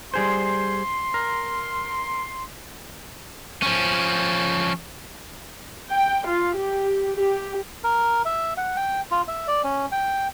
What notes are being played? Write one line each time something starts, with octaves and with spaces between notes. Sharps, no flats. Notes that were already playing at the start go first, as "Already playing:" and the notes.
G3 G#4 C5 C6
A#4
F3 C#4
G5
F4
G4
G4
A#4
E5
F#5
G5
F4
E5
D5
C#4
G5